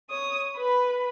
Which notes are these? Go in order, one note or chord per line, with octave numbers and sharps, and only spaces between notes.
C#5 D#6
B4 B5